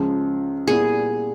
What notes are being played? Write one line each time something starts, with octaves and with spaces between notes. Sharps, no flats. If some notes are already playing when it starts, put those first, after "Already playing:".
Already playing: C#2 C#3 F3 G#3
A#2 G3 B3 E4 G#4